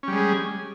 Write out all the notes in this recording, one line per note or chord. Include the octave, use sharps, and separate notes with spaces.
G3 G#3 C#4 G#4